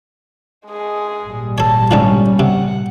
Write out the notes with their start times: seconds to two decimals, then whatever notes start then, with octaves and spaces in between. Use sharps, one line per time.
0.67 G#3 G#4
1.23 G#1 A#2 G3
1.58 A4 C#5 A5
1.91 G#2 D3 F3 C#4
2.39 C3 F#5